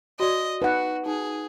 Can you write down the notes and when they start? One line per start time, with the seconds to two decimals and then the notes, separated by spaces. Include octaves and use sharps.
0.20 F#4 D5 D#5
0.62 D#4 F#4 B4 F#5
1.06 D#4 G#4